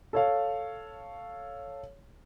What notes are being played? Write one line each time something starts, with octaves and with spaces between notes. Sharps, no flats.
A4 C#5 F5